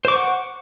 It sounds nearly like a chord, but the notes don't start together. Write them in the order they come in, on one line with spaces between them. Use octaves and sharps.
C5 D6 C#6 F#5